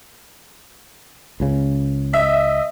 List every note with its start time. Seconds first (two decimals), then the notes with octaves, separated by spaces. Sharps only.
1.40 C#2 C#3
2.13 D#5 E5